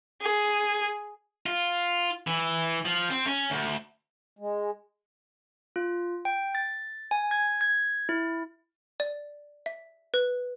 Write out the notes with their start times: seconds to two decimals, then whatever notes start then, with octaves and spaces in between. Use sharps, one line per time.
0.21 G#4
1.46 F4
2.27 E3
2.85 F3
3.11 C4
3.27 C#4
3.50 D2
4.39 G#3
5.76 F4
6.25 G5
6.55 A6
7.11 G#5
7.31 G#6
7.61 G#6
8.09 E4
9.00 D5
9.66 E5
10.14 B4